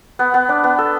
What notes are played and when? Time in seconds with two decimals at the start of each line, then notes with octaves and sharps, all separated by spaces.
0.19 B3
0.34 B3
0.49 D4
0.64 B3
0.78 A4